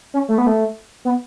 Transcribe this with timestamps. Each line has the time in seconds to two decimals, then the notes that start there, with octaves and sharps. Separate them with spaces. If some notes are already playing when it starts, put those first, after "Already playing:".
0.14 C#4
0.28 A3
0.38 B3
0.47 A3
1.05 B3